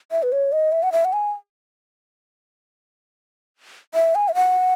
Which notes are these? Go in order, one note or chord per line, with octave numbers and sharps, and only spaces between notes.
E5
B4
C#5
D#5
E5
F#5
E5
F#5
G#5
E5
G#5
E5
F#5